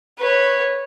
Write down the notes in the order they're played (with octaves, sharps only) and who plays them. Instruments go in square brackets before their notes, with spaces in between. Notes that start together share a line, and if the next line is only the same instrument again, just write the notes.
[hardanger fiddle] B4 C#5